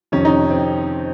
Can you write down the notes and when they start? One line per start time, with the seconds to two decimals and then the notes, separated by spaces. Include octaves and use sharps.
0.12 F2 C3 D#3 C#4
0.25 D#4
0.51 C4